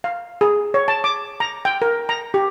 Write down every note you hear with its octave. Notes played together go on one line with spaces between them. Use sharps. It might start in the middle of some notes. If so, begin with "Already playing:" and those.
F5
G#4
C#5
A5
D6
A#5
G5
A#4
A#5
G4